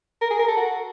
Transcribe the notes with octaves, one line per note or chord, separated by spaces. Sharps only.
A#4
G#4
A#4
A4
F#4